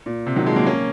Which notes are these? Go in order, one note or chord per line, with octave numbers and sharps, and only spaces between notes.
A#2
C3
D#3 F#3
F3 G#3
F#3 A#3
A#3 C#4